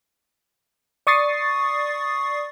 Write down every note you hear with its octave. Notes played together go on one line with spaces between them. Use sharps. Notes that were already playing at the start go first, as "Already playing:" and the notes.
D5 C#6 D#6 A6 C7